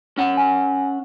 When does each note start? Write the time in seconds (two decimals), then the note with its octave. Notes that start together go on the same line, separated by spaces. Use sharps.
0.18 C#4 F#5
0.37 G#5